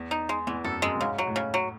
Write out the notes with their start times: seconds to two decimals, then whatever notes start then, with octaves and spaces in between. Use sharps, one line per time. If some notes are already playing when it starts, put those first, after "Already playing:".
Already playing: E2
0.11 D#4
0.29 G#3
0.47 E2 E3
0.64 F#2 A4
0.82 F#2 G#3
0.95 F#2
1.00 G#2 C#3
1.18 F#3
1.27 A2
1.36 C#3
1.54 F#3